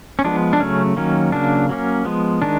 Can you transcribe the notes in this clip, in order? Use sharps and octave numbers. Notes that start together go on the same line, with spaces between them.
C#4
F3 G#3 B3 D4
D4
C#3 F#3 A3 C#4
D#3 F#3 A#3 C#4
C#3 F#3 A#3 D4
F#3 A#3 C#4
F3 G#3 B3
D#3 G#3 D4